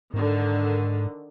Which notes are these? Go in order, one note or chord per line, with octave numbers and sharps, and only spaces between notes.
G#2 D3 D#3